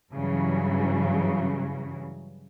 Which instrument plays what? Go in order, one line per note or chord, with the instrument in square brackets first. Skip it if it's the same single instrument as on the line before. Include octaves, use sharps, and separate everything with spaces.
[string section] G2 C#3 E3 F#3